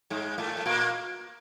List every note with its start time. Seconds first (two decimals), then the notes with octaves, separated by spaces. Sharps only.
0.10 G#2 G#3
0.38 A2 A3
0.57 A3
0.66 A#2 A#3